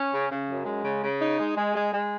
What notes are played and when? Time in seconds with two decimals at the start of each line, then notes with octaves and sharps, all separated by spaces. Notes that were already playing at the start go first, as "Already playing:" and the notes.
Already playing: C#4
0.12 C#3
0.30 C#3
0.48 F#2
0.65 G#3
0.83 C#3
1.02 C#3
1.20 D#4
1.38 G#3
1.55 G#3
1.74 G#3
1.92 G#3